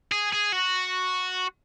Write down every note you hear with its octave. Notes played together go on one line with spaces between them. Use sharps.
G#4
G#4
F#4